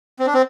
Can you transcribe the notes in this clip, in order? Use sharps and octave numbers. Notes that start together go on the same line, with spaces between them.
C4
D4
C4